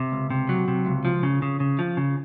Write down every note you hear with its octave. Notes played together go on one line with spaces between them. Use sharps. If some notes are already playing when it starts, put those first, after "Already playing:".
Already playing: C3
C#2
C3
F#3
C3
C#2
F3
C#3
C#3
C#3
F3
C#3